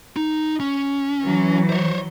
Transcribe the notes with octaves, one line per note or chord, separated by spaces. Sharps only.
D#4
C#4
E3 F#3
C5 C#5